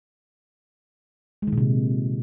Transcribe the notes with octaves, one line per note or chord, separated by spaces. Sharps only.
G#3
D#3
A#2
C3